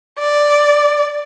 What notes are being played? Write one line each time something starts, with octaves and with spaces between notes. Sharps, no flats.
D5